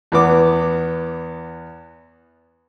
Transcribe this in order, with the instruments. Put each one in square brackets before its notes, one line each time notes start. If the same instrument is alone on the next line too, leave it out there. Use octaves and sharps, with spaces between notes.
[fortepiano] E2 B3 D6